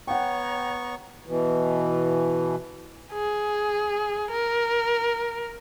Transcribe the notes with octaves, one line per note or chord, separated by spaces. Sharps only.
B3 C#5 F#5 G5 A#5 C#6
B2 E3
G#4
A#4